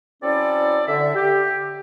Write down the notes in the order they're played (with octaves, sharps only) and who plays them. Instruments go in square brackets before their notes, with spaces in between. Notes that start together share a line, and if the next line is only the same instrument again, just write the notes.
[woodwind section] F#3 C4 C#4 E4 A4 D5
D3 E5
G4